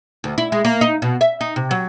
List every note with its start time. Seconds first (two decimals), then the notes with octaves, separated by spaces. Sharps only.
0.24 D2
0.38 E4
0.52 G#3
0.65 A#3
0.81 D#4
1.02 B2
1.21 E5
1.41 D#4
1.56 C3
1.71 F#3